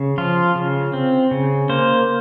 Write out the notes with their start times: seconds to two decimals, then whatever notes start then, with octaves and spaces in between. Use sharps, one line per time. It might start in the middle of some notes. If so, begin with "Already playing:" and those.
Already playing: C#3
0.18 F3 F4
0.55 C#3
0.94 C4
1.31 C#3
1.69 A#3 C5